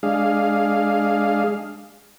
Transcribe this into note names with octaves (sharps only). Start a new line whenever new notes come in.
G#3 D4 G#4 F5